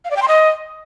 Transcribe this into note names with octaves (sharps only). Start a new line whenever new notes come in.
F5
D5
G5
C6
D#5